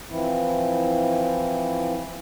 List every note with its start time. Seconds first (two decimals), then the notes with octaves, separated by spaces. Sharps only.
0.10 E3 F3 C4 E4